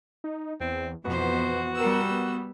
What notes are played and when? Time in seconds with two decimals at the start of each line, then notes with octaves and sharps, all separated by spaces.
0.24 D#4
0.61 E2 C4
1.05 F2 B2 E3 B3 F#4 C5
1.77 G3 G4 A#4 F#5 E6
2.11 B3